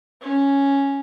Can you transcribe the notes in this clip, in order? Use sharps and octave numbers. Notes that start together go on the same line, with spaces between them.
C#4